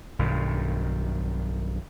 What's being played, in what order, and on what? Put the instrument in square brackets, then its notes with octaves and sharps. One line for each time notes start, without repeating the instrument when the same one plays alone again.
[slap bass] B1 G2 D#3